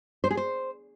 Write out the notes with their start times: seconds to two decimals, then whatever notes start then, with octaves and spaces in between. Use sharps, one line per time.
0.24 C5
0.31 G#4
0.37 C5